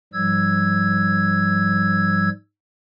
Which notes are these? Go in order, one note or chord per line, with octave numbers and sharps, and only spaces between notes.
G#2 F3 G3 E6 G#6